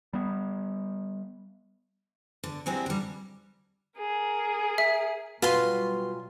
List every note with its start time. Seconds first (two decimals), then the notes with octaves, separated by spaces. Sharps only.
0.13 G3 B3
2.44 D3
2.66 F#3 G#3 C4 D4 E4 G4
2.86 D3 G3
3.98 G#4 A#4
4.78 E5
5.42 B2 F#3 G3 F4 F#4 B4 G#5 C6